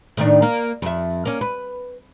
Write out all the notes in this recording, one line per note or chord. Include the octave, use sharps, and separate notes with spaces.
A2 D#3 D4
A#3
F2 E5
A#3 C#4
B4